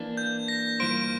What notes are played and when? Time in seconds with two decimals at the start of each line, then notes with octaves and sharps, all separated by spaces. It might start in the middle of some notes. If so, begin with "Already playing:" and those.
Already playing: E3 A#3 D4
0.17 G6
0.48 A#6
0.80 G2 E3 A#3 F4 C5 D7